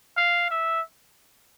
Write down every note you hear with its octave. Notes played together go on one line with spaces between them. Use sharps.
F5
E5